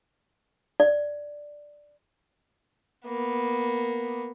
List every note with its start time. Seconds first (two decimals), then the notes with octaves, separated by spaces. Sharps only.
0.80 D5
3.06 A#3 B3